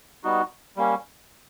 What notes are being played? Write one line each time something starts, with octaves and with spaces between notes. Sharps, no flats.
G3 B3 D#4 F#4
G3 A#3 C#4